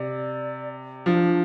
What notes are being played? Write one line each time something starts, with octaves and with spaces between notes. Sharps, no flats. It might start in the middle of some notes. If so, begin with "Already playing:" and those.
Already playing: C3 D5
F3 D4